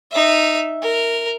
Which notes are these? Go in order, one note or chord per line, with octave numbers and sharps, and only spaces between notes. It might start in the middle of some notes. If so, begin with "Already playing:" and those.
D#4 E5
A#4